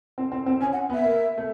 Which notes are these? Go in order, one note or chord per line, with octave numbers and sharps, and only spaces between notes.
C4
C4
C4
C#4 G#5
F#5
B3
E5
A#3
A3